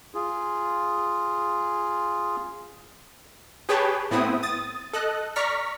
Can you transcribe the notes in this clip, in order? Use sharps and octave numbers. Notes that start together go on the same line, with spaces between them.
F4 G#4
G4 G#4 B4 C#5 G5 A5
A2 B3 C4 E4 D#6
D#6 A6
A4 D#5 F#6
D5 A#5 C#6 F6 B6